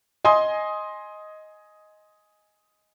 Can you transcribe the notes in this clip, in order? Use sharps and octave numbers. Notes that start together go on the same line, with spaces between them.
D#5 G#5 C6 D#6